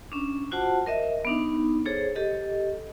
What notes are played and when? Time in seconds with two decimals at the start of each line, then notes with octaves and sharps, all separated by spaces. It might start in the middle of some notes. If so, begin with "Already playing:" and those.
0.12 C#4 D4
0.51 F4 F#4 C5 F#5 A5
0.86 A#4 D#5 E5
1.25 B3 D4 D#4
1.86 G#4 A4 C5 C#5
2.16 G4 A4 D#5